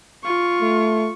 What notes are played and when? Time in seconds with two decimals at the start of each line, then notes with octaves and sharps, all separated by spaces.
0.24 F4 C#6
0.62 A3